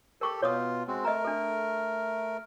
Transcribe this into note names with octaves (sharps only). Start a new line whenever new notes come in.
G4 A4 A#4 C#6 D6
B2 F4 C#5 D6 D#6
G#3 C4 F#4
A3 A#4 D#5 A#5
D4 A4